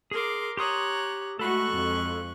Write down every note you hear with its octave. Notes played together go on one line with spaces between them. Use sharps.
G#4 A#4 C6 D6
G4 C#5 A#5 C6 D#6 F#6
G#3 A3 F#4 A4 B5 C#6 F#6
F2